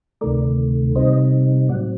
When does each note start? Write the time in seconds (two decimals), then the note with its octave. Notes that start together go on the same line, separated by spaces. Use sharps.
0.21 D2 C3 D#3 A3 A#4 D5
0.96 C3 G3 C4 D#4 C5 D#5
1.69 A2 F#3 C4 D5 F#5